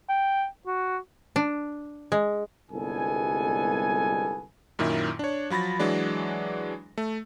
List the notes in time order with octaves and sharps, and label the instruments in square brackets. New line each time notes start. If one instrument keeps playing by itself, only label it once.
[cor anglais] G5
F#4
[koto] D4
G#3
[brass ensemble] G1 C2 G#3 B3 A4 G#5
[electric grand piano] F#2 A#2 D#3 E4
D4 C#5
F3 F#3 B5 A6 A#6
E3 F#3 G#3 D4
A3